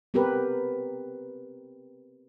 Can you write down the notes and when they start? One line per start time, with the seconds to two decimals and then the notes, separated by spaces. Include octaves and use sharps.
0.14 B3 C4 G4 A#4 B4